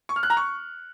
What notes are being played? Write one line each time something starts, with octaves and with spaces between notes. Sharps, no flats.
C#6
F6
F#6
A#5
C#6